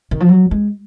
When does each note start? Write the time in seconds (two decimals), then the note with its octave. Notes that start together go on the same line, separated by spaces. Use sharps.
0.11 D#3
0.20 F3
0.29 F#3
0.51 G#3